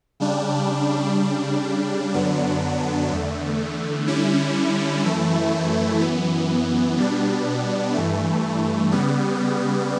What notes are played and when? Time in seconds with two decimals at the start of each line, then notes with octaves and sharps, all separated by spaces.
0.20 C#3 G3 D4
1.17 C#3 G3 D4
2.14 F#2 D3 F#3 B3 D4
3.11 E2 D3 A3
4.07 D3 G3 C#4 E4
5.05 F#2 E3 A3 E4
6.01 F#2 E3 B3
6.97 B2 G3 B3 D4
7.94 G2 E3 A3
8.92 C#3 G3 B3